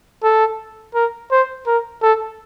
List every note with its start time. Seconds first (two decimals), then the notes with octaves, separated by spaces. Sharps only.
0.23 A4
0.95 A#4
1.31 C5
1.67 A#4
2.02 A4